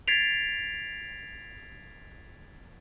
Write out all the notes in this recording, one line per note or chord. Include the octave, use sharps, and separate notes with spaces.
G#6 A6 B6 C7 D7 F7